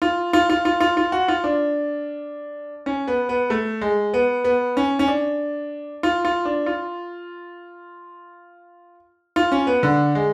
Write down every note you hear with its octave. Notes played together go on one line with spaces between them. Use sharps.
F4
F4
F4
F4
F4
F4
F#4
F4
D4
C#4
B3
B3
A3
G#3
B3
B3
C#4
C#4
D4
F4
F4
D4
F4
F4
C#4
B3
D3
G#3